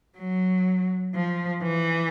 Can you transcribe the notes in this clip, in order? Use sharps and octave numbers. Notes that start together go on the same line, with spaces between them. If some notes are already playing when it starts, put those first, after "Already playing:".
F#3
F3
E3